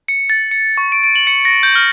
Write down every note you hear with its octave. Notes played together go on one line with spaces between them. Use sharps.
C#7
A6
C#7
C#6
D7
D7
F#7
C#7
A#6
G6
F6